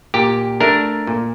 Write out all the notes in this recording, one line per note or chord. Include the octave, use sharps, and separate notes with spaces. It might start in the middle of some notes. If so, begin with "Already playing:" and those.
A#2 G4
A3 D4 A#4
A#2